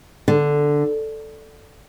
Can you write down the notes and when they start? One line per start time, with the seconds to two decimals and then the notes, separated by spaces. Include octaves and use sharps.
0.28 D3